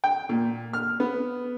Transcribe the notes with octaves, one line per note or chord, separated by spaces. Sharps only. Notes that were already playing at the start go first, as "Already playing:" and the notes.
G5
A#2
F6
B3